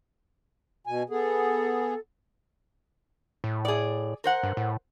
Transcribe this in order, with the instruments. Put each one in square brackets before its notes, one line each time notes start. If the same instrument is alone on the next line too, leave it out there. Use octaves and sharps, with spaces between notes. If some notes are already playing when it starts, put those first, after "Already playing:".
[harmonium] B2 G#5
[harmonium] B3 G#4 [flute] A4
[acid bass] A2
[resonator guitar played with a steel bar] G#4 D5
A#4 C5 F#5
[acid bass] G2
A2